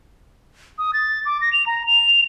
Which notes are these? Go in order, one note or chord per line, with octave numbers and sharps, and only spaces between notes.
D#6
A6
D6
A#6
F7
A#5
F7